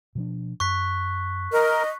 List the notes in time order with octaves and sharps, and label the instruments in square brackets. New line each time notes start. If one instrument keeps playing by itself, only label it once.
[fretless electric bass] B2 F3 D4
[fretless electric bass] F#2 [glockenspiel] C#6 F#6 B6
[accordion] A#4 [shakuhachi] D#5